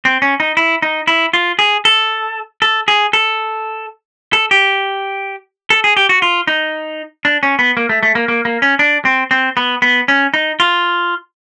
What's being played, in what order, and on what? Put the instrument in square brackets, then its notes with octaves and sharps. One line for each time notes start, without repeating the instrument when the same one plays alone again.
[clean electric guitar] C4
C#4
D#4
E4
D#4
E4
F4
G#4
A4
A4
G#4
A4
A4
G4
A4
G#4
G4
F#4
F4
D#4
D4
C#4
B3
A#3
A3
A3
A#3
A#3
A#3
C#4
D4
C4
C4
B3
B3
C#4
D#4
F4